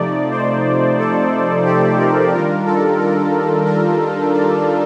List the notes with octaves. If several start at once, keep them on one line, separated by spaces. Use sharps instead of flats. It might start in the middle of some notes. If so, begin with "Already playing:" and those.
Already playing: C3 F3 A3 D#4 D5
C5
A4
G4
A#4
D#3 G3 D4 F4 A#4
A4
A#4
A#4
D5